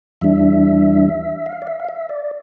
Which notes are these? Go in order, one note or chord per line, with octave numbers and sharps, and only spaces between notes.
E2 E3 G3 D4 E5
F5
D5
E5
F5
E5
D5